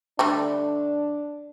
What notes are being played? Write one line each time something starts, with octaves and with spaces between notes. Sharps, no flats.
D3 G3 A3 D4